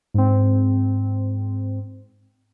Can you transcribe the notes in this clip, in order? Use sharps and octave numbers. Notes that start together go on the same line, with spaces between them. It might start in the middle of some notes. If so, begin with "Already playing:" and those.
G#2 C4